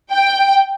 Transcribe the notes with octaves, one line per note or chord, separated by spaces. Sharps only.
G5